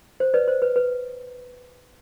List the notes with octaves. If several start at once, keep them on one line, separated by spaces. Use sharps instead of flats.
C5
B4 D5
C5
B4
B4